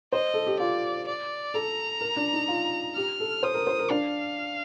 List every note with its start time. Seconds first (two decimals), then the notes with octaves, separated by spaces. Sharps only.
0.12 C5 D#5
0.34 A4
0.47 G4
0.59 F4 D5
1.07 D5
1.54 A4 A#5
2.01 A#4
2.16 D4
2.33 D#4
2.48 F4
2.95 G4 F6
3.20 A4
3.43 C5 D#6
3.54 A#4
3.67 C5
3.79 A#4
3.90 D4 F5